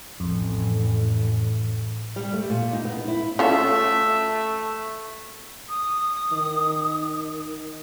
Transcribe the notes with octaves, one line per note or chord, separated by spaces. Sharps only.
A1 F2
G3
A3
A#2
D#4
B3
E4
A3 C#4 F4 A4 E5
D#6
D#3